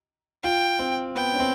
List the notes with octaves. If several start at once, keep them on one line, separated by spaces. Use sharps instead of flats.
F4 G5
C4
B3 G5
C#4
C4